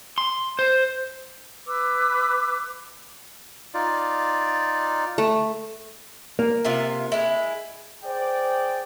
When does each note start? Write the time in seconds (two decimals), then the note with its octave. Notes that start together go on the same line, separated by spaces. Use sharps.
0.18 C6
0.59 C5
1.66 B4 D6 E6
3.74 D#4 F4 D5
5.18 A3
6.39 A#3
6.64 C3 F4 E5
7.12 G#3 E4
8.04 G#4 C5 D5 G5